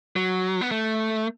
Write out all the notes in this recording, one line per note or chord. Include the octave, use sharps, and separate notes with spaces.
F#3
B3
A3